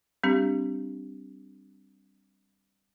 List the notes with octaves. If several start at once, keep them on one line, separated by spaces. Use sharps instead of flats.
G3 C4 D4 G4